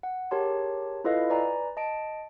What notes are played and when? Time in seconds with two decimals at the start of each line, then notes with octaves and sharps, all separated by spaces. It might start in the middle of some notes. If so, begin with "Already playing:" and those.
0.03 F#5
0.31 G4 G#4 A#4 C#5 A5 C6
1.04 E4 F4 A4 B4 D#5 F5
1.30 B4 D5 G#5 A#5
1.77 D#5 A5 D7